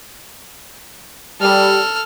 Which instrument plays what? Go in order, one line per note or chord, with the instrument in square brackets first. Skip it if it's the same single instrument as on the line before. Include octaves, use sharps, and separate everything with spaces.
[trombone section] G3 [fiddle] A4 F6